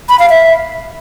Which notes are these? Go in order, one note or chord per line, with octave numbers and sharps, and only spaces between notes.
B5
F5
E5